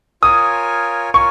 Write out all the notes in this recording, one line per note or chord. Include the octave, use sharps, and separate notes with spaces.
F4 A#4 C#5 G#5 D#6
F4 A#4 C#5 G#5 C#6